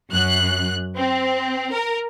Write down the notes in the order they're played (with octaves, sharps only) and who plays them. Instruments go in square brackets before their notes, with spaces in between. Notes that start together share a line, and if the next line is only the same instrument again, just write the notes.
[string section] F#2 F#6
C4
A#4